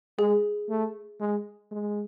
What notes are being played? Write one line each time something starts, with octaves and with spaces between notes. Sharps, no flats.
G#3 G#4
A3
G#3
G#3